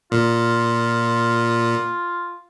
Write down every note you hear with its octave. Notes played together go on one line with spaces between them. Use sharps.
A#2 F4